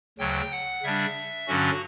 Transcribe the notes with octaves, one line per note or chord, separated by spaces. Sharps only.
D2 C#3 F#3 G5
F#5
C#3 G3 D4 E5
G2 D3 F#3 C#4 F#4